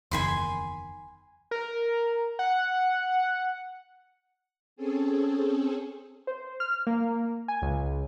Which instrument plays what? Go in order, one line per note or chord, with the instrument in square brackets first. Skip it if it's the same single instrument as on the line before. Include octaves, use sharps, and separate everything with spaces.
[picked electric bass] F#1 E2 D#3 [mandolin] G#5 B5 C6
[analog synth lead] A#4
F#5
[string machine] C4 C#4 G#4 A4
[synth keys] C5
F6
A#3
G#5
C#2